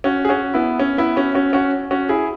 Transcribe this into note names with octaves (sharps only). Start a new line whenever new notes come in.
C#4 F#4
G#4
C#4 F#4
B3 E4
C#4
B3 E4
C#4 F#4
C#4 F#4
C#4 F#4
C#4 F#4
E4 G#4